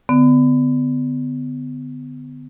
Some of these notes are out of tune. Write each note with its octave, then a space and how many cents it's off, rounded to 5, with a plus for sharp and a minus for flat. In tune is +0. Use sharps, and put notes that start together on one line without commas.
D3 +0 B3 +30